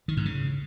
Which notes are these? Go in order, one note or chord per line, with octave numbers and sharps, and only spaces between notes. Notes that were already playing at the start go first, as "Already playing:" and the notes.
D#3
G#2
C#3